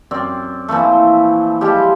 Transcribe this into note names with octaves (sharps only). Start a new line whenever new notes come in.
F#2 C4 D5
A#2 E3 F3 A3
F3 G3 G#3 G4